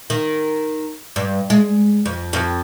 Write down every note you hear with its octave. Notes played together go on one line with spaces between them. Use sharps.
D#3
G2
G#3
F2
F2